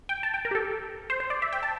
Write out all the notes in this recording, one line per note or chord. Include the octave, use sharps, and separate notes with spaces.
G5
A5
G5
A#4
G4
A4
C5
C5
D5
E5
G5
A5